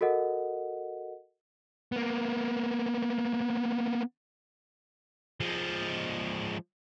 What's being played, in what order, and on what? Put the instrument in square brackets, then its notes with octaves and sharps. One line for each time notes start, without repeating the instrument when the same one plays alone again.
[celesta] F#4 A4 A#4 D#5 F#5
[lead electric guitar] A#3 B3
[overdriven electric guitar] F3 G#3